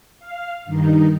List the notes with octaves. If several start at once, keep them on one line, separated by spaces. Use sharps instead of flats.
F5
G2 D#3 D#4